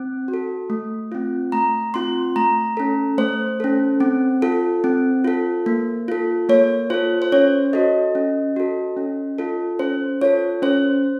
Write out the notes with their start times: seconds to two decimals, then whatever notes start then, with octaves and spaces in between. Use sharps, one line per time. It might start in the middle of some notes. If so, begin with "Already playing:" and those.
Already playing: C4
0.28 F#4
0.34 A4
0.70 A3
1.12 C4 F4
1.52 A3 A#5
1.94 C4 F4 C6
2.36 A3 A#5
2.77 C#4 A4
3.18 A3 C5
3.60 C#4 A4
4.00 C4
4.42 F4 A4
4.84 C4
5.25 F4 A4
5.66 A#3
6.08 F4 A4
6.49 A#3 C#5
6.90 F4 A4 C5
7.22 C5
7.32 C#4 C#5
7.73 F#4 A4 D#5
8.15 C#4
8.56 F#4 A4
8.97 C#4
9.38 F4 A4
9.79 C#4 C5
10.21 F4 A4 C#5
10.62 C#4 C5